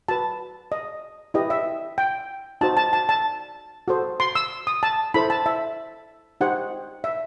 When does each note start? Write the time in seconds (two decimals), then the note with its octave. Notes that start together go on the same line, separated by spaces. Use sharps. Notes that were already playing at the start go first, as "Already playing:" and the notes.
0.08 F#4 B4 A5
0.72 D#5
1.34 E4 G4 B4 D#5
1.50 E5
1.98 G5
2.61 D#4 F#4 C5 A5
2.77 A5
2.93 A5
3.09 A5
3.88 F#4 A4 C5
4.20 C6
4.35 E6
4.67 D#6
4.83 A5
5.14 E4 A4 C5 B5
5.30 A5
5.46 E5
6.41 D#4 G4 C5 F#5
7.04 E5